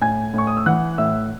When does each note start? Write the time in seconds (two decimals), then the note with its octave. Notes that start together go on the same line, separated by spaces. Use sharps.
0.01 A2 G#5 G#6
0.34 A2 C#6
0.47 D#6
0.57 E6
0.66 E3 F#5 F#6
0.98 A2 E5 E6